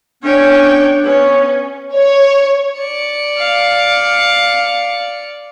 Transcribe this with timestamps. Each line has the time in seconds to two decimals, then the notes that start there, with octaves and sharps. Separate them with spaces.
0.23 A2 B3 C#4 D4 C#5 G5
1.04 B3 C#4 C#5
1.95 C#5
2.78 D5 C#7
3.38 F5